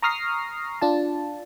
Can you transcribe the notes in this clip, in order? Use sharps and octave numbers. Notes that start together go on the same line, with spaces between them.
A#5 C#6 D#6 F6 A#6 C7
D4 F4 A5